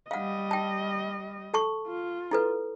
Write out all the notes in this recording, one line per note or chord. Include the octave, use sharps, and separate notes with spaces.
G3 D#5 F5 F#5
G5 A5
A4 A5 C#6
F4
E4 A4 B4